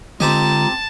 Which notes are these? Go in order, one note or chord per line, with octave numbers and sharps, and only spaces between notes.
D3 G#3 C4 F4 G4 D#5 A5 A#5